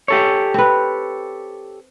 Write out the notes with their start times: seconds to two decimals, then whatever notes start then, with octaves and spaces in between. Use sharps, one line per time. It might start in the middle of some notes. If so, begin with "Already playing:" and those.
0.08 G4 A4 C#5
0.54 C4 B4